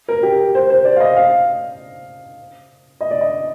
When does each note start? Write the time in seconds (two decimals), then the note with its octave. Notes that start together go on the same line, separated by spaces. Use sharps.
0.08 A#4
0.23 G4
0.55 C5
0.70 C5
0.85 D5
0.96 F5
1.00 D#5
1.17 F5
3.01 D#5
3.11 D5
3.21 D#5